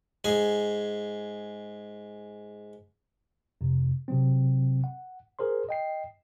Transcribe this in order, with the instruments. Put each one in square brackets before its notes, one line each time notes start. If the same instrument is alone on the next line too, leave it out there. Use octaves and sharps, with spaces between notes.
[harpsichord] G#2 G#4 G#5
[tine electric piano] F2 C3
C3 F#3 C4
F#5
G#4 A#4 C5 C6
D#5 G5 C7